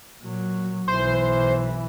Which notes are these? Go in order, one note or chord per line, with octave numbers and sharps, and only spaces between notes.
A#2 F#3
B1 E3 C5